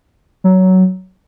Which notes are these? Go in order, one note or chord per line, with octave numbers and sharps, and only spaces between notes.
F#3